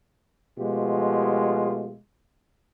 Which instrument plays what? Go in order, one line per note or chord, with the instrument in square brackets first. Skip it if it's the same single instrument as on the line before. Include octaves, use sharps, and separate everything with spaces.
[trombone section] B2 F3 G#3 A3 F4 G4